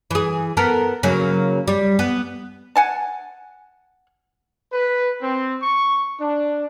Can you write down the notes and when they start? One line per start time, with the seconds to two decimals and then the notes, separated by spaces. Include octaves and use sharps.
0.11 E3 G#4
0.57 B3 A4 A#4
1.03 C#3 F#3 A#3
1.68 G3
1.99 B3
2.76 F#5 G#5 A5
4.73 B4
5.22 C4
5.62 C#6
6.20 D4